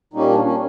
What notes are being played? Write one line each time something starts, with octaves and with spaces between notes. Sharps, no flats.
A#2 G3 A#3 C#4 D#4
D4
C#4